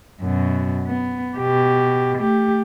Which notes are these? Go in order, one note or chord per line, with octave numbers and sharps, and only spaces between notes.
F#2 B2
B3
B2 G4
A3 G4